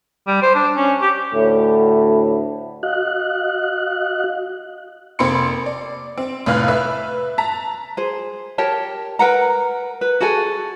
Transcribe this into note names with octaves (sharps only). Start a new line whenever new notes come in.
G3
C5
D4
C#4
G4
D2 A2
F#4 D#5 F5 F#6
F1 A#3 C4 B5 C6 C#7
D5
C4
F1 A2 B4 F5 F6 F#6
B4 E5
A5 A#5 B6
G#4 C5
G4 A#4 C#5 A5
A#4 B4 F#5 A#5
B4
F#4 G#4 A4 G#5